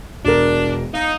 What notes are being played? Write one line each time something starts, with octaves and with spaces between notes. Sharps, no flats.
E1 D4 A#4
D#4 F5